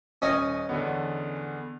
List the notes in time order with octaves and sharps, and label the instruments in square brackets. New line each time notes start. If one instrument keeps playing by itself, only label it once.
[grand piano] D#1 D#6 [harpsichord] C#4 D#5 G#5
[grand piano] E2 D3 B3